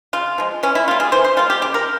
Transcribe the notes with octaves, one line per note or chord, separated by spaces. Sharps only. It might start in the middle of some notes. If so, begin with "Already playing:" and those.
C#3 F4
F3 G#3
E3 C#4
E4
G3 A#3 F4
G#4
E3 C5
C5
G3 A#3 F4
G4
C#3 G4
A#4